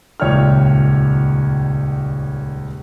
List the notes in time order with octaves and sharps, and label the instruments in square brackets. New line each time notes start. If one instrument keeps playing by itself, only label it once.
[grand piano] D#1 C#2 C#5 D5 G5 F6